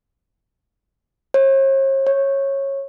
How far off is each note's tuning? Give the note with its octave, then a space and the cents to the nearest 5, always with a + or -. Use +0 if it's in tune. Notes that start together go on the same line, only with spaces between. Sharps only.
C#5 -45
C#5 -15